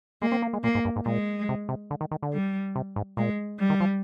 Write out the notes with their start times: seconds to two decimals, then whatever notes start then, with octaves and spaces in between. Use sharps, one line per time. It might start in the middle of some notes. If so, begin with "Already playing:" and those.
0.22 G#3 A#3
0.32 C4
0.42 A#3
0.53 G#3
0.64 A#2 A#3
0.75 G#2
0.85 G2
0.96 G#2
1.06 A#2 G#3
1.49 C3
1.69 C3
1.91 D3
2.01 D#3
2.11 D#3
2.22 D3
2.33 G3
2.76 C3
2.96 G#2
3.17 A#2 G#3
3.59 G3
3.70 D#3
3.80 F3